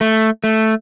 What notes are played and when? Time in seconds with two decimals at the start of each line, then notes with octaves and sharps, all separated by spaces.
0.01 A3
0.44 A3